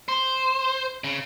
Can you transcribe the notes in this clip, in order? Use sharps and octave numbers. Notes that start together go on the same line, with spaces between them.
C5
C#3